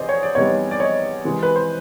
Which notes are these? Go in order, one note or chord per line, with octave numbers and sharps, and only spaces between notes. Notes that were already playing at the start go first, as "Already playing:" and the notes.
Already playing: E2 C3 D#3 B3 G#4 C5 D5 D#5
C#5
D5
E2 C3 D#3 G3 B3 C#5 D#5
D5
C#5 D#5
C3 E3 G#3
B4
C5